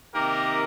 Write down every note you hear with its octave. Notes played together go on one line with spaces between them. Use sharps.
C3 D#3 A#3 D#4 G4 A#4